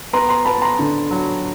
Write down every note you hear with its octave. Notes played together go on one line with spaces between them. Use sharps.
B3 A#5 C6
A#5 C6
B3 A5 B5
A#5 C6
D3
F#3